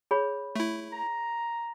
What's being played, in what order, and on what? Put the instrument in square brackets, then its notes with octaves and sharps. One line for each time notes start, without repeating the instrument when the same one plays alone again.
[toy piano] G#4 C#5 B5
[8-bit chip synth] A3 E4
[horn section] A#5